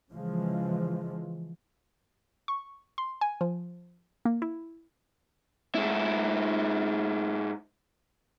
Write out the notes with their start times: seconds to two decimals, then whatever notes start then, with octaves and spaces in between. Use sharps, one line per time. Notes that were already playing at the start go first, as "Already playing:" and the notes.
0.12 C#3 E3 F3 G#3
2.48 C#6
2.98 C6
3.21 G#5
3.41 F3
4.25 A#3
4.42 E4
5.75 G#2 E4